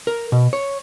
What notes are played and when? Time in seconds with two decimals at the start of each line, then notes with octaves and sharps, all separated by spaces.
0.07 A#4
0.32 B2
0.53 C#5